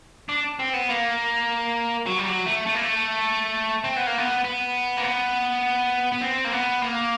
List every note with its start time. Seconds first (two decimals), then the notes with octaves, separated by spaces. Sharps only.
0.29 D4
0.59 C4
0.74 B3
0.89 A#3
2.07 F#3
2.19 G3
2.26 F#3
2.47 A3
2.67 A3
2.75 A#3
2.82 A3
3.84 C4
3.97 B3
4.07 A#3
4.18 B3
4.44 B3
4.97 A#3
5.03 B3
6.12 B3
6.21 C4
6.45 A#3
6.52 B3
6.82 A#3